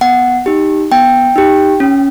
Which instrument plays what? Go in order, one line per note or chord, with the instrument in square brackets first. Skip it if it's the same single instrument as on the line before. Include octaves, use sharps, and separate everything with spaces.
[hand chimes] B3 F#5
D#4 G4
B3 G5
D#4 G4
C#4